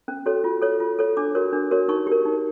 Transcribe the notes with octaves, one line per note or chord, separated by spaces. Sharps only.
C#4
F#4 A4 C#5
F4
A4 C#5
F4
A4 C#5
D4 D6
F#4 A#4 C#5
D4
F#4 A#4 C#5
D#4 C#6
G4 A#4
D#4